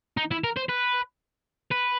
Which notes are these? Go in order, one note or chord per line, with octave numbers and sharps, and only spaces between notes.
D#4
E4
A#4
C5
B4
B4